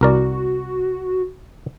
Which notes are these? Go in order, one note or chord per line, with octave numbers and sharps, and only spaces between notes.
C2 F#4 A#4 D5